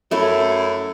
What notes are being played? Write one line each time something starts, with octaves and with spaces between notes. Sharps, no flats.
F#2 A3 E4 C#5